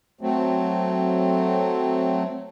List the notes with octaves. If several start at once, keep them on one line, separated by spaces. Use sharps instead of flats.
F#3 A3 C4